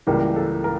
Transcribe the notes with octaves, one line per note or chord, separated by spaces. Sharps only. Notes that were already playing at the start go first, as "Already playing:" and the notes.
C#2 C#3 E3 G3 A#3 A#4
A4
A#4